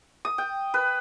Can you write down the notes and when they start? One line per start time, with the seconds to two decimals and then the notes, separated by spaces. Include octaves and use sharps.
0.25 D#6
0.38 G5
0.74 B4